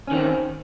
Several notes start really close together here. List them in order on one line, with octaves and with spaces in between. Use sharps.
C#4 D#3 C4